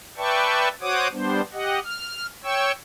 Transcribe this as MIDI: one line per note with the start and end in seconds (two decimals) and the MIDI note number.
0.17 0.68 71
0.17 0.68 74
0.17 0.68 76
0.17 0.68 79
0.17 0.68 81
0.17 0.68 85
0.81 1.08 66
0.81 1.08 72
0.81 1.08 73
0.81 1.08 78
0.81 1.08 86
0.81 1.08 87
1.12 1.41 55
1.12 1.41 59
1.12 1.41 62
1.12 1.41 72
1.53 1.80 67
1.53 1.80 75
1.53 1.80 78
1.84 2.26 89
2.43 2.72 73
2.43 2.72 79
2.43 2.72 85
2.43 2.72 88